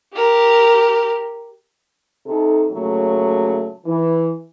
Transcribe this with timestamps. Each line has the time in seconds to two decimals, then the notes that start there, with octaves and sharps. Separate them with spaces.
0.14 G4 A#4
2.27 C3 D#4 A4
2.71 A#2 C#3 F#3 A3
3.85 E3